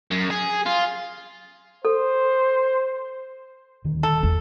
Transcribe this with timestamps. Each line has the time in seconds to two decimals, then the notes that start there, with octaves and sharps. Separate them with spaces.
0.11 F#2
0.30 G#4
0.66 F4
1.85 A4 C5
3.84 D#1 D2 D#3
4.03 A4
4.23 E2